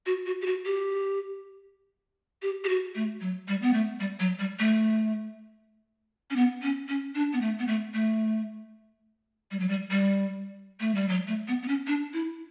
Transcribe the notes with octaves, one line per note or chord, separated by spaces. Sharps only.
F#4
F#4
G4
F#4
G4
G4
G4
F#4
A3
F#3
G3
B3
A3
G3
F#3
G3
A3
C#4
B3
C#4
C#4
D4
B3
A3
B3
A3
A3
G3
F#3
G3
G3
A3
G3
F#3
A3
B3
B3
C#4
D4
E4